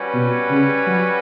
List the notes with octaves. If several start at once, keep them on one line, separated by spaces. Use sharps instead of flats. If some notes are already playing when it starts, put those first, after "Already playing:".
Already playing: G3 C#4 F#4 B4
B2
C#3
F#3